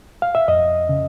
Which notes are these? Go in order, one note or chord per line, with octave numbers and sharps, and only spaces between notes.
F5
E5
F2 D#5
C#3